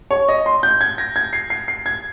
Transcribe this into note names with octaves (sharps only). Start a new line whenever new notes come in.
C#5
D#5
C6
G6
G#6
A#6
G#6
C7
C7
C7
G#6